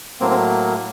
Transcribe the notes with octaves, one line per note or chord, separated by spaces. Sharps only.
A2 F#3 A#3 C4
C4